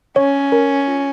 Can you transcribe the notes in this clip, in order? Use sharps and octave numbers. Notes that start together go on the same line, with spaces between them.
C#4 C#5
A#4
F4